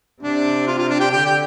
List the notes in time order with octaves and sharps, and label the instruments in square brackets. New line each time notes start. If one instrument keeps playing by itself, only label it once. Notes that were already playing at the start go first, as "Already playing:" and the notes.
[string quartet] C3 [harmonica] D4
[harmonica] F4
F4
D4
G4
[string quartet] D3 [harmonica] G4
[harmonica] G4